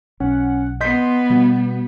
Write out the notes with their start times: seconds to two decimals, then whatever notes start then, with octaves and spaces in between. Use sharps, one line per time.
0.20 B1 C#4 F#5
0.81 B3 D#5 C6 G6 B6
1.30 B2 G3